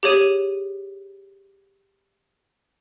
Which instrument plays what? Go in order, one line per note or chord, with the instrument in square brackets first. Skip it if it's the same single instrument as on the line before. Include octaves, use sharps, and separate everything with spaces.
[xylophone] G4 G#4 C#5 D#7